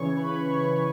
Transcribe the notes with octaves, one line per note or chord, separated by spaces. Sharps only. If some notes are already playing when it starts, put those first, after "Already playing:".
Already playing: C#3 E3 C#5 C#6
B4 B5
C#5 C#6
E3 B4